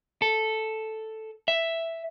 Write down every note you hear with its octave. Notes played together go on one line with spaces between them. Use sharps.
A4
E5